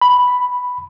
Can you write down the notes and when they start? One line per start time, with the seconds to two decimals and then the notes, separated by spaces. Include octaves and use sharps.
0.01 B5